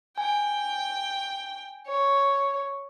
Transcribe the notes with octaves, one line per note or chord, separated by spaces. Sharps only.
G5 G#5
C#5